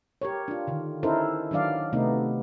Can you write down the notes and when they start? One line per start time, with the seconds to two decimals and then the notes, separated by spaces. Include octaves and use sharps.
0.22 G4 A#4 C#5
0.48 D4 F4
0.67 D3 D#3
1.03 C#4 D#4 E4 A4 A#4 C5
1.51 D#3 F#3 D4 D5 F5
1.93 C3 A3 B3 D#4